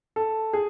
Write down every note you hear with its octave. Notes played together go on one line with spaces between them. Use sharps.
A4
G#4